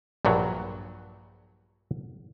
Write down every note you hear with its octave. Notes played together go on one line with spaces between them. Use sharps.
A#1 G2 A#2 F#3